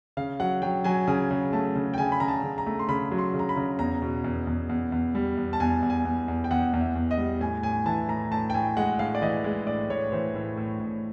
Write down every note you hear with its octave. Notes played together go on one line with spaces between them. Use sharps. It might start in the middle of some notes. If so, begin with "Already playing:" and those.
C#3 F5
F#3 F#5
F#3 G5
F#3 G#5
C#3 G#5
C#3
A3 A5
C#3
G5
C#3 G#5
B5
C#3 A#5
A5
C#3
A#5
A3
C6
C#3 B5
F#3
C6
C#3
A#5
B5
C#3
E2 A#5
B2
E2
E2
E2
E2
G3
E2
A5
E2 G#5
E2
G#5
E2
E2
G5
E2 F#5
E2
E5
E2
D#5
G3
A2 G#5
A2 G#5
E3 A5
A2 A#5
A2 A5
G5
A2 G#5
G#3 F#5
A2 F5
D5
E3 D#5
G#3
A2 D5
A2 C#5
E3 C5
A2
A2
A2